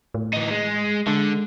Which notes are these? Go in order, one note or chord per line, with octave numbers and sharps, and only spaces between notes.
A2
E3 D#4
G#3
D3 G#3